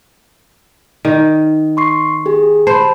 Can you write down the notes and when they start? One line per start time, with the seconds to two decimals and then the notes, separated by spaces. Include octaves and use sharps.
1.05 D#3
1.77 C6 C#6 C7
2.26 G4 G#4
2.67 C5 A5 B5